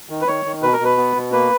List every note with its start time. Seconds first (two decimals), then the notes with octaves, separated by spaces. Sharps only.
0.09 D#3
0.21 B4
0.27 D#3 C#5
0.45 D#3
0.62 B2 B4
0.73 A#4
0.80 B2 B4
0.97 B3
1.16 B2
1.32 A#3 B4